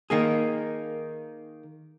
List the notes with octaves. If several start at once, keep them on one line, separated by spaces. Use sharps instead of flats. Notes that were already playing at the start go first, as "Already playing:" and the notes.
D#3 A#3 G#4